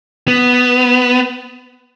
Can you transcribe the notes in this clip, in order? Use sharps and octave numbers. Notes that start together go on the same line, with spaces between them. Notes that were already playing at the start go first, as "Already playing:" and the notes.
B3